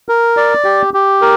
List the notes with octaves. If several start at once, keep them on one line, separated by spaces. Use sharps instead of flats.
A#4
D5
G4
G4
A#4